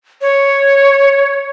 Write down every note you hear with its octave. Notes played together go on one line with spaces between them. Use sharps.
C#5